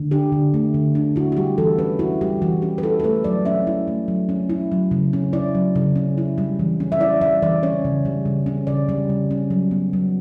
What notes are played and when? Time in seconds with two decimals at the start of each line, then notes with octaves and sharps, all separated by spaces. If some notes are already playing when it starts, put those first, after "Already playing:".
Already playing: D3
0.11 D4 G4
0.32 D3
0.54 A3
0.74 D3
0.95 D4
1.16 E4 F#4
1.32 F#4
1.37 G3 G4
1.58 E3 A4
1.78 C#4 B4
1.99 E4 F#4
2.21 G3 G4
2.42 E3 F#4
2.62 C#4 G4
2.78 B4
2.83 E4 A4
3.00 A4
3.03 A3 B4
3.24 F#3 D5
3.45 C#4 E5
3.67 E4
3.88 A3
4.08 F#3
4.29 C#4
4.50 E4
4.72 F#3
4.91 C#3
5.13 C#4
5.33 E4 D5
5.55 F#3
5.76 C#3
5.96 C#4
6.18 E4
6.38 G3
6.59 E3
6.80 C#4
6.92 E5
7.00 E4 D5
7.21 G3 E5
7.42 E3 D5
7.63 C#4 C#5
7.85 C#3
8.05 G3
8.25 C#3
8.46 C#4
8.67 C#3 D5
8.89 G3
9.10 C#3
9.31 C#4
9.51 F#3
9.71 B3
9.93 F#3